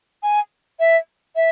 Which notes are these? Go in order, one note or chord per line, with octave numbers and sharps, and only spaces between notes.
G#5
E5
E5